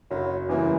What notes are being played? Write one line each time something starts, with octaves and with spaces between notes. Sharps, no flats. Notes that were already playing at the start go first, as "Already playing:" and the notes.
F#1 F#3
E2 C#3 E3 G3 A#3